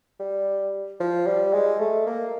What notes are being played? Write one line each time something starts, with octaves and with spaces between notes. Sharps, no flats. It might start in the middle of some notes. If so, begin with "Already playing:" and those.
G3
F3
G3
G#3
A3
A#3